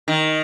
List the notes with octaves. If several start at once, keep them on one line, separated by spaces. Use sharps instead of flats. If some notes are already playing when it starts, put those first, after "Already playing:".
D#3